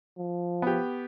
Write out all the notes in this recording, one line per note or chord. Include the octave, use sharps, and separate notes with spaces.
F3
B3 G4